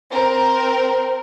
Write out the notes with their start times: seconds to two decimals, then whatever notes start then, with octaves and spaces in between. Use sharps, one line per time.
0.12 C4 A#4